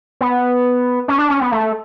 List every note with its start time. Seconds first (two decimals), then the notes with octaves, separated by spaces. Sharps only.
0.21 B3
1.08 C#4
1.18 D4
1.30 C#4
1.41 B3
1.52 A3